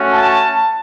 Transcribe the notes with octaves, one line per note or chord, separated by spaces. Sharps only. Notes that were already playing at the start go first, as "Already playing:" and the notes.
Already playing: A3 C#4 F#4
A5